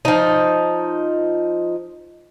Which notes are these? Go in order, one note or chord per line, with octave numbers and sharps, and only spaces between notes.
F3 D#4